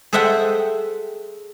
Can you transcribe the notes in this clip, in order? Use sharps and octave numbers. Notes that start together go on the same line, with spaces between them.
G#4 A4 C5 E5 F#5 G5